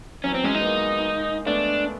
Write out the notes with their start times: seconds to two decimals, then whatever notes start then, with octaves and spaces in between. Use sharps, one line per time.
0.24 E3 F#3 C#4
0.34 C4
0.44 F#3 G#3 C#4
0.54 D#4
0.61 B3
0.64 G#3 A#3
1.46 A3 B3 D4